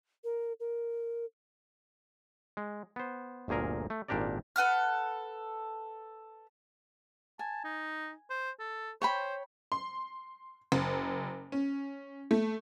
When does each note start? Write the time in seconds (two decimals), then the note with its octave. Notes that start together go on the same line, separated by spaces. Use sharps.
0.24 A#4
0.60 A#4
2.57 G#3
2.96 B3 C5
3.48 G1 D2 A#2 G#4 A#4
3.90 A3
4.08 G#1 A#2 D4 G4 A#4 D5
4.56 A4 B4 F#5 F6
7.39 G#5 A5
7.64 D#4
8.30 C5
8.60 A4
9.02 C5 C#5 G5 B5
9.72 C6
10.72 F#1
11.52 C#4
12.31 A3